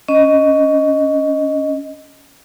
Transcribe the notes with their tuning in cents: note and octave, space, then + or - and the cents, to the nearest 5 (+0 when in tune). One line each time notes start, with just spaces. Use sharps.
C#4 +15 D#5 +0